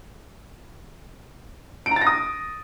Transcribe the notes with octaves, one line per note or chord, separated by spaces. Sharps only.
D7
A#5
A6
A#6
D#6